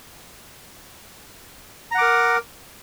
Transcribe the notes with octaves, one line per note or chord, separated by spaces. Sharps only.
A#4 F#5 A#5 D6